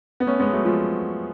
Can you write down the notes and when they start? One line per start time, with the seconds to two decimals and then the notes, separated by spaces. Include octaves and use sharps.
0.20 B3
0.27 A3 C#4
0.40 G#3 B3
0.53 F#3 A3
0.65 F3 G#3